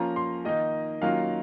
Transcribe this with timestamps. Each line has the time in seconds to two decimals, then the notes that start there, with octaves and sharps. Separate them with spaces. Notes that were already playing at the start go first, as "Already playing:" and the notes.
Already playing: F3 A#3 C#4 F4 A#5
0.16 C6
0.45 D#3 A#3 D#4 D#5
1.02 D#3 F#3 A#3 C#4 F4 F5